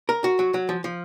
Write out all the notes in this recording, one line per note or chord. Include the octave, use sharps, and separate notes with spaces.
A#4
F#4
F#3
F#3
F3
F3